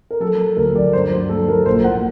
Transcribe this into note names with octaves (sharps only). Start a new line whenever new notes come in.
A#4
F#3 A4
F#3
D2 A#4
F#3 D5
G2 C5
F#3
A3 A4
F#3 A#4
A#1 C5
A2 F#5